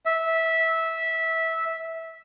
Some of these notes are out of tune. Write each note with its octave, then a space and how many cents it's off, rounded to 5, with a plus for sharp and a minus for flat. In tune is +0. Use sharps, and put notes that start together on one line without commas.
E5 -15